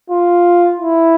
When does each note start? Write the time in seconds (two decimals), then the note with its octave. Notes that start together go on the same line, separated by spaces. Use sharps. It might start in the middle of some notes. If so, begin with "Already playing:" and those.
0.10 F4
0.80 E4